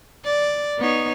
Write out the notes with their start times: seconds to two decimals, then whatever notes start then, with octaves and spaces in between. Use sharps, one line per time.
0.24 D5
0.79 B3 D#4 C#5